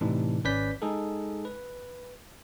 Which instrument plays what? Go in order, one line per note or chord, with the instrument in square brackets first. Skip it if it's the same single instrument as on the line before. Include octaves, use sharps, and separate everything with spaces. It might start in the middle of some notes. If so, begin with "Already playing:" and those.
[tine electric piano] A2 C3 E3 D4 D#4
G#1 C#4 B4 D5 G6 B6
G#3 D#4 G#4 A4
B4